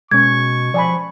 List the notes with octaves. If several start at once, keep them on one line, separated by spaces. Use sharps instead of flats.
B2 G#3 C#4 C#6 G#6
F3 D5 G#5 B5